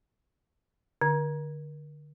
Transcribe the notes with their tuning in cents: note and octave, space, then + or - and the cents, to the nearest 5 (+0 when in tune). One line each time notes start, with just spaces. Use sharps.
D3 +15